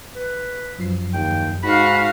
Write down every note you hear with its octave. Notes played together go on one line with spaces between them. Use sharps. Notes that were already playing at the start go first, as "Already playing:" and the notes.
B4
F#2 F3 C7
D#2 G5
G#2 D#4 F#4 F5 B5